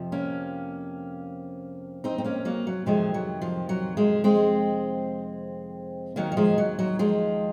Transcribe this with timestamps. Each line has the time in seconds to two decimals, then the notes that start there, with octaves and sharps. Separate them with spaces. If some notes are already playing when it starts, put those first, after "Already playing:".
Already playing: F2 C3 F3
0.12 A#3 C#4
2.04 C4 D#4
2.18 C4
2.25 A#3 C#4
2.45 F#3 A#3
2.67 F#3
2.86 F2 C3 D#3 F3 G#3
3.14 F#3
3.42 F3
3.69 F#3
3.97 F3 G#3
4.24 G#3 C4
6.16 D#2 D#3 F#3 A#3
6.32 F#3
6.37 F3 G#3
6.58 F#3
6.79 F#3
6.99 F3 G#3